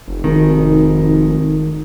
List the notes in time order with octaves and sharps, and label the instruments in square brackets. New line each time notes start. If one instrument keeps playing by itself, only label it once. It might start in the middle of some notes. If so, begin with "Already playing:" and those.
[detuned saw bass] F1
[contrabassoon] G#1 [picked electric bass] D#3